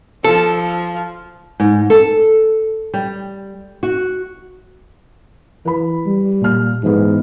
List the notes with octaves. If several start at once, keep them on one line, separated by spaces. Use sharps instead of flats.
F3 A4
G#2
A4
G3
F#4
E3 B4 B5
G3
A#2 F6
G#2 E3 B3